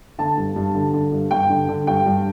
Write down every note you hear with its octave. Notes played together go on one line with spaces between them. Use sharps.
D3 A5
G2
G2
D3
D3
G2
G2 G5
D3
D3
G2 G5
G2